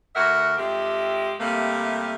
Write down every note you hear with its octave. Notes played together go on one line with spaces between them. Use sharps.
D2 F#4 A#4 E5 F#5
F2 G#3 G4 E5
C3 G3 A3 A#3